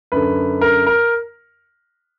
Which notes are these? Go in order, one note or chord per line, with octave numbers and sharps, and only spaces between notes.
F#2 D3 B4
A#4
A#4